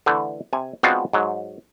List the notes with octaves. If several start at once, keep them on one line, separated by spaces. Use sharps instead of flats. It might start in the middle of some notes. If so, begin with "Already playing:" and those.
D3 E3 A3
C3 G#5
G#3 B3 C4 D4 F4 F#4
G#2 F#3